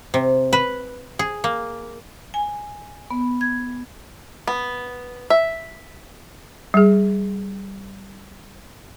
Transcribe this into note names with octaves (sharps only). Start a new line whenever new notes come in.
C3
B4
G#4
A#3
G#5
B3
G#6
B3
E5
G3 G#4